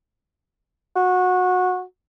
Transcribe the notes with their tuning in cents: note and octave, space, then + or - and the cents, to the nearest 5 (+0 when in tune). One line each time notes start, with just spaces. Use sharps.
F#4 -20